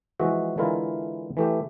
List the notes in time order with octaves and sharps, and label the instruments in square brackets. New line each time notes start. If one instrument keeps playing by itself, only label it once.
[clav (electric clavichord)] E3 F3 G#3 F#4 D#5 E5
D3 E3 G#3 E4 F4 A#4
E3 A3 G4